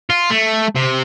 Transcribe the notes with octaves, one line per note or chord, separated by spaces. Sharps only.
F4
A3
C3